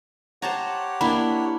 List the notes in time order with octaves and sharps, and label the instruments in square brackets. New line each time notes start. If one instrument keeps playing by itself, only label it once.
[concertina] G4 C#5 F#5 [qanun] C5 A5 A#5
[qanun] A#3 D4 E4 [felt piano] B5